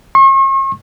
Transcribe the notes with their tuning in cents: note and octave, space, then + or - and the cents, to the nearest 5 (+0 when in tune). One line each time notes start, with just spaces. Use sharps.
C#6 -45